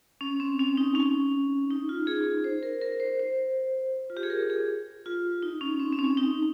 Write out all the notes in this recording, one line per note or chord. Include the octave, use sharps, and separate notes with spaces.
C#4
C4
C#4
D#4
C#4
D#4
F4
G#4
C5
A#4
A#4
C5
C5
F4
G4
G#4
A#4
G#4
F4
D#4
C#4
C4
C4
C#4
D#4